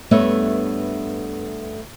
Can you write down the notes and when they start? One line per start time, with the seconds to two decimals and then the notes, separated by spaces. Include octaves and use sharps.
0.11 G2 A3 B3 C#5 E5